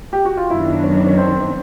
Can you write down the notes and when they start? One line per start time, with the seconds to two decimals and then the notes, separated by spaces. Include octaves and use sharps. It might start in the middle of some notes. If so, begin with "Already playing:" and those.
0.13 G4
0.25 F#4
0.37 F4
0.50 F#2 D#3 F#3 B3 D4 E4
0.84 C#4
1.07 C#4
1.18 C4